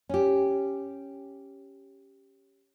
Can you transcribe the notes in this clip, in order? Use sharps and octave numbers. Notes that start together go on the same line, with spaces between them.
C#4 G4